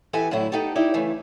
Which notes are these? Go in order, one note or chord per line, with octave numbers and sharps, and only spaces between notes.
E3 B3 G4 A4 E5 G#5
A2 D3 F#3 E4
B3 D#4 G4 A4
D#4 E4 G4 D5
C#3 E3 A3